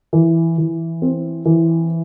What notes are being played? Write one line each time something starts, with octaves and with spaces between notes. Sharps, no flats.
E3
E3
C4
E3